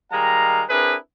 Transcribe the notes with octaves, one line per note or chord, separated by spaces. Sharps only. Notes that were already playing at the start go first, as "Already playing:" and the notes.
D#3 G3 G#3 F5 A#5
C4 D4 E4 G#4 A#4 B4